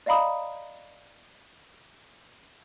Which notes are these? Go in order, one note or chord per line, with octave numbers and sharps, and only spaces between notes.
D5 D#5 F5 A#5 B5 D#6